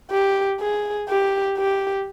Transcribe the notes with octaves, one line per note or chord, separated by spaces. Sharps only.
G4
G#4
G4
G4